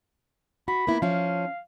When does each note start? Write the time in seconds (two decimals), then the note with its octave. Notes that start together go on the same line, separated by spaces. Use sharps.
0.68 F#4 B5
0.87 A#3 B3 E4
1.02 F3 C#4 F5